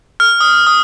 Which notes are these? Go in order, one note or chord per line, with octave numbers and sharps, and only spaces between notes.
F6
D#6
D#6